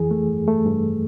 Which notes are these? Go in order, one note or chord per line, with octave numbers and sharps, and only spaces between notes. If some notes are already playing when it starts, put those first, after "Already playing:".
Already playing: F2 E3 G#4
A3
G2
A3
G2